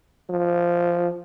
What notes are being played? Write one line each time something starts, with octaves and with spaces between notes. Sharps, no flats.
F3